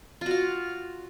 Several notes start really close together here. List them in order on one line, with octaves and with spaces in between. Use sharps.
F4 F#4 F5